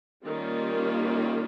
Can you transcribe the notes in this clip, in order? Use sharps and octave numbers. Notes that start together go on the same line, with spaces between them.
D#3 G3 A#3 C#4 F4